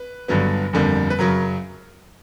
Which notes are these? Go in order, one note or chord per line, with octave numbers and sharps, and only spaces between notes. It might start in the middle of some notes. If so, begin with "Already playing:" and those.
Already playing: B4
G1 G2 D3 F#3 B3
G1 F2 D3 G3 A#3
B4
F#2 C#3 F#3 A#4